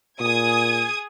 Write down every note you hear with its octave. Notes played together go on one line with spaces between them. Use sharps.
A#2 G#4 D#6 G#6